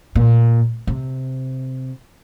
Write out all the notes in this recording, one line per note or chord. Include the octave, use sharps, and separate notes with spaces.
A#2
C3